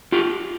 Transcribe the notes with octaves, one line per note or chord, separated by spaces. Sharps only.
F4 G4